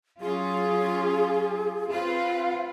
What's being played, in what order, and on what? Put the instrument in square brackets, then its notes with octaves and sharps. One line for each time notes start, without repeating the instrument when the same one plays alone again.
[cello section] F#3 C#4 F4 [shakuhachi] G#4
[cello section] C4 F4 B4 [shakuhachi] F5